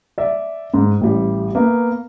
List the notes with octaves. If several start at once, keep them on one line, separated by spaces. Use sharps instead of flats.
D5 E5
G#2
A1 G3
A#3 B3